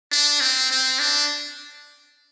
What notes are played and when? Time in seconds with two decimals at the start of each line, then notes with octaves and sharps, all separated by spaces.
0.12 D4
0.41 C4
0.71 C4
0.99 D4